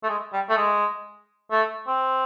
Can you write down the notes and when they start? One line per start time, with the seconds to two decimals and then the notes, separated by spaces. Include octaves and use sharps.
0.04 A3
0.09 G#3
0.33 G3
0.50 A3
0.57 G#3
1.52 A3
1.87 C4